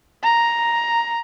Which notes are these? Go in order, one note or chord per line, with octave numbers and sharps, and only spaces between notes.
A#5